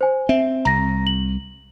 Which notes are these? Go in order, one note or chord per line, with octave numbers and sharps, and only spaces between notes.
C5 G#5
C4 E5
C2 A#5 A#6
F#7